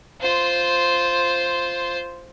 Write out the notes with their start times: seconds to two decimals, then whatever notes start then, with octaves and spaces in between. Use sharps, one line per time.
0.21 F4 C5